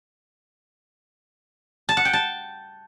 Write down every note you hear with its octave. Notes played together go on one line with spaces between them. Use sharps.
A5
F#5
G5
A5